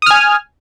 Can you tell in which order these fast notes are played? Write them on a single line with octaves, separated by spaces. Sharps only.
D#6 F6 G#5